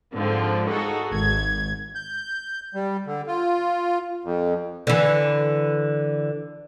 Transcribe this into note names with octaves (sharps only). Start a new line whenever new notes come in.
G#2 D3 F3 C4
D#4 F#4 G#4 A4
G#1 G#6
G6
G3
D3
F4
F2
D3 E3